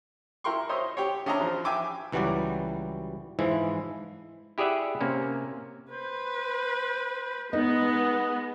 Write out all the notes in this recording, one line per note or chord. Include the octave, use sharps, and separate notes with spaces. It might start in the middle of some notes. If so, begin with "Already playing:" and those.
E4 A#4 G5 C6 C#6
C5 C#5 D#5 E5
G4 C#5
C#4 D4 D#5 E5 A#5
F3
E5 G5 G#5 D6 E6
C#2 E3 F#3 G3 F#4 D5
G#2 E3 F3 G#3 E4
E4 G4 G#4 D5 E5 F#5
C3 A#3 C#4
B4 C5
G#3 B3 D#4 D#5